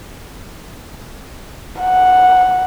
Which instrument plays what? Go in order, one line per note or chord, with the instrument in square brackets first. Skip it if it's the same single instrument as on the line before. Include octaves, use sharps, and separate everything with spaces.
[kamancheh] F#5